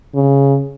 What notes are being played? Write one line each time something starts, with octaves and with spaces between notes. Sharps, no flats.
C#3